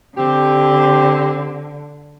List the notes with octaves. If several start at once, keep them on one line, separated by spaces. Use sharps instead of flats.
D3 C4 G4